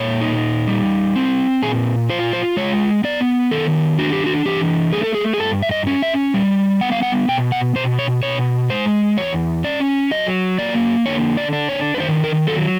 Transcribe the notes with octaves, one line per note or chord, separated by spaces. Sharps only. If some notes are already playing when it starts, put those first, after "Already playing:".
Already playing: A#2 A#3 C#5
D#4
G3
C4
A#2 G#4
F4 C5
C5
G#3 C#5
B3 D5
D#3 A4
D4 F#4
G4
F#4
E3 G4
A3 G#4
A4
G#4
G#4
G2 A4
E5
D#5
C#4
E5
G3
B3 F#5
F5
F#5
B2 G5
F#5
B2 C5
C#5
B2 C#5
G#3 C5
E2 C#5
C#4 D5
F#3 D#5
A#3 D5
D3 C#5
D5
D4
C#5
B4
D#3 C5
A#4
F#3 A4